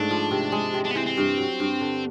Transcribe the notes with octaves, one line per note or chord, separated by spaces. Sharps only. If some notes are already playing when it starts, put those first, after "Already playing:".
Already playing: G#2 A3 D4
F3
C3
G#3
C3
D4
B3
E3 C4
C4
G2
F#3
G2
D3